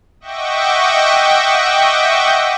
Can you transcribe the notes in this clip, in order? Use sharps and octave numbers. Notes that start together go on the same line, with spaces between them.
D#5 E5 F#5 G5 C#6 D6